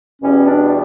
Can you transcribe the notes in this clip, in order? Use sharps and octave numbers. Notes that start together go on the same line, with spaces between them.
E2 B2 G3 C#4
D4